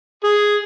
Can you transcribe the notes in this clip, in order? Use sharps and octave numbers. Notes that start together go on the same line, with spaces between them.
G#4